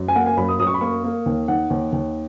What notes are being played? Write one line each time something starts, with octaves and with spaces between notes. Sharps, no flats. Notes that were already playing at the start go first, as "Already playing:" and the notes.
Already playing: F#2
G#5
A#3 F#5
G#5
F#2 B5
D#6
F#2 D#6
C#6
B5
A#3 C#6
A#3
D#2
D#3 F#5
D#2
D#2